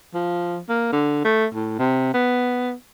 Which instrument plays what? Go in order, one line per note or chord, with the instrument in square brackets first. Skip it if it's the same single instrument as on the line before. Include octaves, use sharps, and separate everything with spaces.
[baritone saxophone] F3
A#3
D3
A3
A2
C3
B3